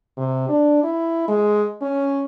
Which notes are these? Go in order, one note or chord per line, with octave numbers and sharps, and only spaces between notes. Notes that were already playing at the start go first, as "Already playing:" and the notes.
C3
D4
E4
G#3
C#4